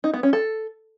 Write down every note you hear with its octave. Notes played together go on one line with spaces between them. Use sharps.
D#4
B3
C#4
A4